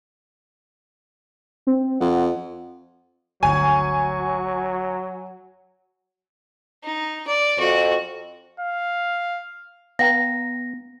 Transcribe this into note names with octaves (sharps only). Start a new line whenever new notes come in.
C4
F2 F#5
G1 D2 F#3 G#5 C#6
D#4
D5
F2 F#4
F5
B3 F5 G5 A#5 A#6